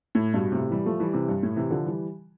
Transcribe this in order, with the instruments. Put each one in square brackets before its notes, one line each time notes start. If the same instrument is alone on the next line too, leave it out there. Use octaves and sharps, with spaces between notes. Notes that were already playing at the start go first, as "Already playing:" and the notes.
[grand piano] A2
G2 B2
A2 C3
E3 G3
F3 A3
E3 G3
C3 E3
G2
A2
C3 E3
D3 F3
E3 G3